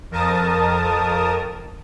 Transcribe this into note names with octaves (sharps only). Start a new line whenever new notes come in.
F2 A#4 A5 D#6